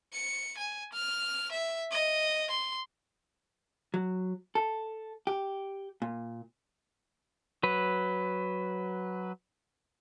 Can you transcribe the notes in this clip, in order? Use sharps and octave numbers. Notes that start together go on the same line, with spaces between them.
C#7
G#5
F6
E5
D#5
C6
F#3
A4
G4
A#2
F#3 B4